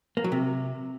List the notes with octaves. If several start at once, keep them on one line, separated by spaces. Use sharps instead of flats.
A#3
F#3
C3